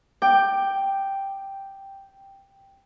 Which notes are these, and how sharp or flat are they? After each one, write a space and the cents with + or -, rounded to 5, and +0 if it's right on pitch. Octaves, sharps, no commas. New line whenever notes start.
G5 +0 D6 +20